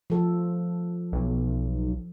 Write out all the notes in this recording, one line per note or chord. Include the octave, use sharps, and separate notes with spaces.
F3 A4
B1